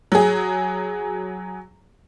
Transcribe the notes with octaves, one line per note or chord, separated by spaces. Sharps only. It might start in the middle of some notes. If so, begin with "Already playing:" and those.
F#3 G#4